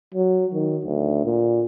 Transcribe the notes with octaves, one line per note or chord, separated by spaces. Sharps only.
F#3
D#3
D2
A#2